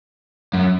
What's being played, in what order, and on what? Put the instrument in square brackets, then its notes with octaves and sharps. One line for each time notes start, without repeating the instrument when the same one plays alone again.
[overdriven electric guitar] F#2